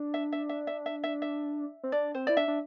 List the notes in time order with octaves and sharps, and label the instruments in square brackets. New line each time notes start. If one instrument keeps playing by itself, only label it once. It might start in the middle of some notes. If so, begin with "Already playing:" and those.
Already playing: [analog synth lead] D4
[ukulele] E5
E5
E5
E5
E5
E5
E5
[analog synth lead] C4
[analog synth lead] D4 [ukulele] D5
[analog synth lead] C4 [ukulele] C5
[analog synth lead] E4 [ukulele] D5
[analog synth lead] D4 [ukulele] E5
[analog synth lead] D4